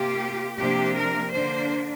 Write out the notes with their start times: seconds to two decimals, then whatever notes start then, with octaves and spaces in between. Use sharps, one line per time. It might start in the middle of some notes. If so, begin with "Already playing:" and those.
Already playing: C3 A#3 F4 G4
0.56 C3 F3 A#3 D4 G4
0.95 A#4
1.32 D3 A#3 D4 C5